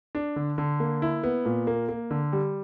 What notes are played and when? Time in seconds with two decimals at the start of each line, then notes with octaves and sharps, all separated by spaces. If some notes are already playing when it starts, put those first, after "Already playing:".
0.15 D4
0.36 D3
0.58 D3
0.80 A#3
1.02 E4
1.23 B3
1.45 A#2
1.67 A#3
1.89 A#3
2.11 D3
2.33 G3